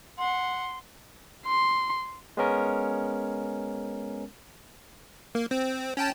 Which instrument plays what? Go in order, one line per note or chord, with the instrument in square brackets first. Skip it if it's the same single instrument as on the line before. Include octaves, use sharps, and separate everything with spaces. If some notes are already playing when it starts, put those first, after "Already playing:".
[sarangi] F#5 [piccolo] C6
[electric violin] C6
[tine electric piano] G#3 B3 C#4 A#4
[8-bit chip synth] A#3
C4
C#4 G5 A5